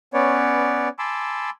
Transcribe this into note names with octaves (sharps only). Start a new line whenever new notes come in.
B3 C#4 B4 C#5 D5
G#5 A5 B5 C6 D6 E6